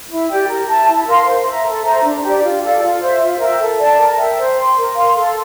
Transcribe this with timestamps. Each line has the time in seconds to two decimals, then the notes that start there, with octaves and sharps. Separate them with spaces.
0.10 E4
0.29 G4 D5 G5
0.48 A#4
0.68 E5 A5
0.87 E4
1.07 A#4 F5 C6
1.26 C5
1.46 E5 A#5
1.65 A4
1.85 C5 E5 A#5
2.04 D4
2.23 G4
2.28 D5
2.44 F4
2.63 A4 D5 F5
2.82 F4
3.01 C5 E5
3.20 F4
3.40 A#4 E5 G5
3.60 A4
3.79 D5 A5
3.98 A#4
4.18 E5 G5
4.38 C5
4.57 G5 C6
4.76 A#4
4.96 F5 C6
5.16 A4